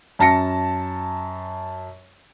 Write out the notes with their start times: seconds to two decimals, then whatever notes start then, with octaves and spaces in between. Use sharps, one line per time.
0.19 F#2 A5 A#6 C#7